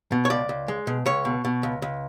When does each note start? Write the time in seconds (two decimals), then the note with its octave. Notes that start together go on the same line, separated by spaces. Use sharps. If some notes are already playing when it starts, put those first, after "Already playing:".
0.12 B2
0.25 C#5
0.30 C#2 D5
0.49 C#2
0.68 G#3
0.87 B2
1.06 C#2 C#5
1.25 B2
1.45 B2
1.63 C#2
1.82 C#2